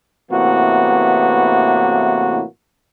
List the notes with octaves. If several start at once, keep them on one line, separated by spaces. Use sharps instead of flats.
A2 C3 E3 A#3 B3 F#4